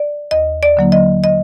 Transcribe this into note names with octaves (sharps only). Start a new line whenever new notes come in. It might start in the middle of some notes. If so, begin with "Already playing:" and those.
Already playing: D5
D#2 D#5
D5
D3 F#3 A#3 D#4
D#5
D#5